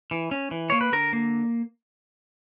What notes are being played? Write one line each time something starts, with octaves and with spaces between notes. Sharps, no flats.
E3
C#4
E3
A#3 C#5
B4
D3 A#4
A#3